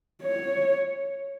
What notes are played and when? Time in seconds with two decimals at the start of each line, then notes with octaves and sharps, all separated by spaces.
0.23 C#5